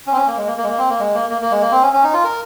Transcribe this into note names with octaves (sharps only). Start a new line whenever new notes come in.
C#4
C4
C#4
A#3
G#3
A#3
A#3
G#3
A#3
C4
A#3
G#3
A#3
A#3
A#3
G#3
A#3
C4
C#4
C#4
D#4
F4
A#4